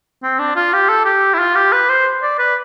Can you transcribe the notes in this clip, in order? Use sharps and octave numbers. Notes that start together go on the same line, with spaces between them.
C4
D4
F4
G4
A4
G4
E4
F4
G4
B4
C5
D5
B4